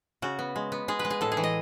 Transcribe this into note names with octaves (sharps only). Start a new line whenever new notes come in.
C#3 F#4
B3
G#3
B3
G#3 G#4
B4
G#3
G#4
A2 A4
G#4
E3
D#5